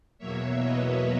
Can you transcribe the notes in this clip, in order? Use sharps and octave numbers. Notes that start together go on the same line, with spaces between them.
E2 B2 F#3 A#3 C#5 E5
B4 D#5